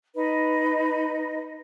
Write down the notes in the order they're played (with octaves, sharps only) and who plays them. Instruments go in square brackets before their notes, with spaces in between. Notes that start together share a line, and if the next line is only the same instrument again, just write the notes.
[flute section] D#4 B4 D#5